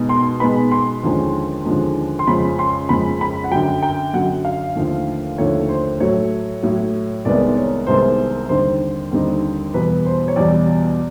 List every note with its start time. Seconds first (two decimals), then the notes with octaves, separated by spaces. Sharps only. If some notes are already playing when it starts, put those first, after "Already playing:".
Already playing: B2 G#3 B3 D#4
0.09 C6
0.40 B2 G#3 B3 D#4 B5
0.71 C6
1.03 D#2 D3 F3 G#3 C#4
1.65 D#2 D3 F3 G#3 C#4
2.19 C6
2.27 F2 C#3 F3 G#3 B5
2.59 C6
2.89 F2 C#3 F3 G#3 B5
3.21 B5
3.44 F#5
3.51 F#2 D3 F#3 G5
3.83 G5
4.13 F#2 D3 F#3 F#5
4.45 F5
4.76 D#2 D3 F3 A3
5.38 D#2 D3 F3 A3 C#5
5.69 C5
6.00 A2 F#3 A3 C#5
6.63 A2 F#3 A3
7.25 C2 C3 D#3 G#3 B3 D5
7.57 C#5
7.87 C2 C3 D#3 G#3 B3 C5
8.49 D#2 D3 G3 C4 D#4 C5
9.11 D#2 D3 G3 C4 D#4
9.74 E2 B2 G3 B4
10.06 C5
10.28 C#5
10.36 E2 B2 G3 D5